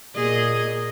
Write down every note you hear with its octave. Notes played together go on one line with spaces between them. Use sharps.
A#2 G#4 D#5